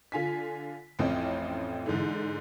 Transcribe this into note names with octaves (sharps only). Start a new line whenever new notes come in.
D3 F4 G#5 B6
A1 F2 C4 C#4 D#5 G5
G#2 D3 E3